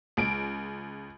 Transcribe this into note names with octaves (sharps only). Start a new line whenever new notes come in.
C#2 D7